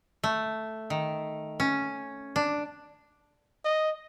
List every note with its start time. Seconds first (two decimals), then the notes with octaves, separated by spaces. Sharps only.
0.24 A3
0.90 D#3
1.60 C#4
2.36 D4
3.65 D#5